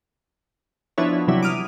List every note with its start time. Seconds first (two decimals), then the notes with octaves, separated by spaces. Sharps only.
0.98 F3 B3 D4 E4 F#4 C#5
1.27 C3 E3 F#3 G3 E4
1.43 D6 D#6 F6